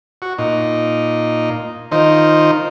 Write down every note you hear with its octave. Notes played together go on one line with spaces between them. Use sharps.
F#4
A#2 D#4
D#3 D#4 F4 C5